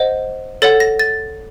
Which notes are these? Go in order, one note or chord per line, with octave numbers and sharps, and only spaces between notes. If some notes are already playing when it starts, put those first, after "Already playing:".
Already playing: C5 D#5 F#5
A4 C#5 F#5 A6
A#6
A6